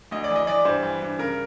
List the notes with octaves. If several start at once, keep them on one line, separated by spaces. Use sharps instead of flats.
D2 D#5
D5
E3
D#5
E3 D5
G2 C5
E3
G2
C#3 A#4